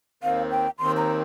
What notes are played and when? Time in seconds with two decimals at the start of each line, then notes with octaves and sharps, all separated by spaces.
0.23 D#2 D#3 C4 F5
0.51 G5
0.79 D#2 D#3 C4 C6
0.97 A#5